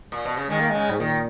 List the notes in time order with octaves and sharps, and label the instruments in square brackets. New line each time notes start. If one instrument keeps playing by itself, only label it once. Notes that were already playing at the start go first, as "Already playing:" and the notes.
[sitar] A#2
B2
C#3
[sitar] D#3 [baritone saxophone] G#3
[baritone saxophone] A#3
[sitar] C#3 [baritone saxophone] G#3
[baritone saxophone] G#2
[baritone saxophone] A#2 [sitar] D#3